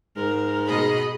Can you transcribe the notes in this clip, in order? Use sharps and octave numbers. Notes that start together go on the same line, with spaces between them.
G#2 A#4
B2 G#4 D#5 B5